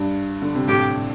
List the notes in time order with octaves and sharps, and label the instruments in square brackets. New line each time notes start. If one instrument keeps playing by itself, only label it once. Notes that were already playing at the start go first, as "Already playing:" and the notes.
Already playing: [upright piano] G2
D3
C3
[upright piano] A2 [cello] G4